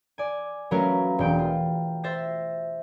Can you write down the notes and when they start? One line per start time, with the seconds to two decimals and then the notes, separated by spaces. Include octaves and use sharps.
0.18 D5 G#5
0.71 F#3 A3 C#4 A#4 B4 F5
1.19 E1 G5 D7
1.39 F4
2.03 C5 E5 A6 A#6 C7